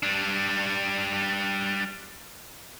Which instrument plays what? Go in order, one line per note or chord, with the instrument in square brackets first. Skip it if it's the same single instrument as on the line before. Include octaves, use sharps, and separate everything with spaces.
[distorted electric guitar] G3 D4